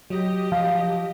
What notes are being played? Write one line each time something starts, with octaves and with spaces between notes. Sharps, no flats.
F#3 G4 D#5
F3 F5